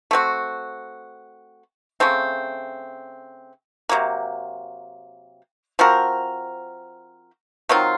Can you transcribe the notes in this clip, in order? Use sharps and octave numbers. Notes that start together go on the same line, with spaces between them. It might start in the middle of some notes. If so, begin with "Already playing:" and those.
A3 C4 F#4
C#3 A3 C4
C3 F#3 A#3
F3 C4 F#4 A#4
D#3 F#3 C4 F4